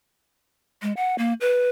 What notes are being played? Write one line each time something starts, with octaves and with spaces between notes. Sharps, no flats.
G#3
F#5
A#3
B4